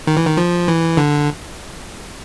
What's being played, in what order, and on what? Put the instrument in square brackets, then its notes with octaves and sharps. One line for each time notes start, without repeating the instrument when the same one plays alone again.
[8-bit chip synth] D#3
E3
D#3
F3
E3
D3